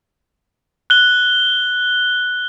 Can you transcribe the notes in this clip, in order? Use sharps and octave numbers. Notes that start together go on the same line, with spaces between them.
F#6 G7